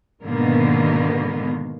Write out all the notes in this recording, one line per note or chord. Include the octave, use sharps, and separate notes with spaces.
G#2 B2 D3 D#3 A#3 B3